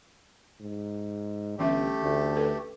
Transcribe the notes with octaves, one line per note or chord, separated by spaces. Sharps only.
G#2
G1 E3 A3 C#4 G4 E5
D2
A4 B4